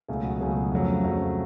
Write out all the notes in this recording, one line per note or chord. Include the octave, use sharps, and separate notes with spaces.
C#2 B2 F#3 A3 G#4
F#4
C#2 B2 F#3 A3 G#4
F2 C#3 F#3 A3
F2 C#3 F#3 A3